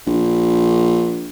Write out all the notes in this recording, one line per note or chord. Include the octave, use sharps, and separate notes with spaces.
A#1